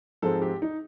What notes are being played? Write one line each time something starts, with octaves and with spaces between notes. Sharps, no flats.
G#2 F3 G#3 C4 A4
G4
D#4